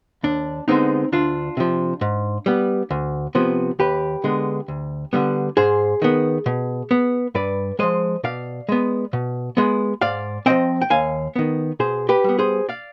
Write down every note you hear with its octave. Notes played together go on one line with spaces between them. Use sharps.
D#2 D4
D3 G#3 B3 C4 D#4
D2 D4 F4
C3 F3
G#2
G3 B3
D2
C3 F3 B3
D#2 G4 B4
D3 G#3 B3
D2
D3 G3 B3
G#2 G#4 C5
D#3 B3
B2
B3
G2 B4 D5
F3 G#3 C5 D#5
B2 D5 F5
G#3 B3
B2
G#3 B3
G#2 D5 F5
F3 C4 D#5 G5
G5
D#2 F5 G#5
D#3 B3
B2 G#4 C5
G4 B4
G3 B3
G#4 C5
D5 F5